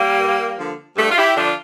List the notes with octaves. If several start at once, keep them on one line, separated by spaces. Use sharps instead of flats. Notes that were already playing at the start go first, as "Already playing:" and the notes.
Already playing: G3 A#3
G2
D3 F3
G2 A3
F4
E4 G4
D3 F3 D4 F4